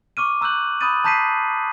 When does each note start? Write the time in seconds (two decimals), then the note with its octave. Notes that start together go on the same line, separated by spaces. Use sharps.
0.17 C#6 D6 F6 D#7
0.41 A#5 E6 F#6 G6 F#7
0.81 B5 D#6 F6 G6 A6 D#7
1.04 A5 A#5 G6 B6 C7 D#7